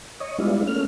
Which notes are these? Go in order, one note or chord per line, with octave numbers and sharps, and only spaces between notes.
C#5 D#5
G3 G#3 B3 D4 E4 F4
A3 A#3 C#4 F6